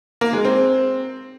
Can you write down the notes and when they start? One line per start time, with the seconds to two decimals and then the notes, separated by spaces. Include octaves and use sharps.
0.21 A#3
0.33 G#3
0.45 C4